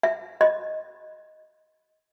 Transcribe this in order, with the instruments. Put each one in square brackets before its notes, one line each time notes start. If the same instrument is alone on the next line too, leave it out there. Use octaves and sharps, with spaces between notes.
[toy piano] E5
D#5